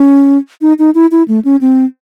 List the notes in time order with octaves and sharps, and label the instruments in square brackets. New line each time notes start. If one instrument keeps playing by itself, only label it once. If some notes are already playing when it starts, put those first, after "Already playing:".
Already playing: [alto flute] C#4
D#4
D#4
E4
E4
A3
C#4
C4